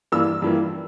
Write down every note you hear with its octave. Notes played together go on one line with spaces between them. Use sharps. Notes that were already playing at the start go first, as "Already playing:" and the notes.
G2 E3 A#3 E6
G2 E3 G3 A#3